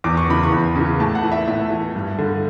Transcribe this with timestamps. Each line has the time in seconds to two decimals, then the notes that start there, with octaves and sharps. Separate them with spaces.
0.04 E2 D6
0.17 C#6
0.28 C#3 E3 B5
0.43 C#6
0.52 E2
0.76 C#3 E3
1.00 A2 A5
1.15 F#5
1.24 E3
1.32 E5
1.47 A2 E5
1.71 E3
1.95 G2
2.19 D3